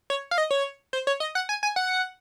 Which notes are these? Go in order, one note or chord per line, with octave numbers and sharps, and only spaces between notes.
C#5
F5
D#5
C#5
C5
C#5
D#5
F#5
G#5
G#5
F#5